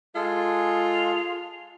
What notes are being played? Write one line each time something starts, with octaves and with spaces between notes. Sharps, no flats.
G#3 F4 G#4 A4